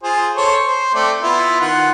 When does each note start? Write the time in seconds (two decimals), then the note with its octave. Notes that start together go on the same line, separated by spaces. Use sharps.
0.03 F4 G#4 C5
0.36 A4 C5 C#5
0.66 C5
0.94 A3 C4 D5
1.22 B3 E4 F4
1.61 D#3 F4 F#5